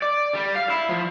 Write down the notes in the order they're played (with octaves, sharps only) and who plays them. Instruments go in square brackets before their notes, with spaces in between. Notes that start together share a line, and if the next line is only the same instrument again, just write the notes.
[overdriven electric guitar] D5
G3
F5
E4
F3